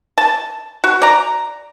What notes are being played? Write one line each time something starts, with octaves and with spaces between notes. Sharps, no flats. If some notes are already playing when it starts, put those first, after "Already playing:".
A5
F#4
D5 A#5